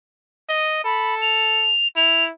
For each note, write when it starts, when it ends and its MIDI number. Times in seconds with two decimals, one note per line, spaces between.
0.49 0.84 75
0.84 1.73 69
0.84 1.15 83
1.21 1.88 101
1.96 2.31 64
1.96 2.24 101